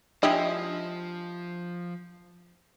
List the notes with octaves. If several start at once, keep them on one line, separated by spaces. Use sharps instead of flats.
F3 G#3 D4 E4 G4 D#5